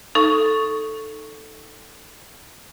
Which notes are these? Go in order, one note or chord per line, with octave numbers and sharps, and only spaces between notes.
D#4 A4 C#6